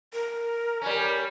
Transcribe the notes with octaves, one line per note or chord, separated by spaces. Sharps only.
A#4
G3 C#4